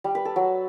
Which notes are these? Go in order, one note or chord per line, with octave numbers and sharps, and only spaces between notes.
G3
B4
A4
F#3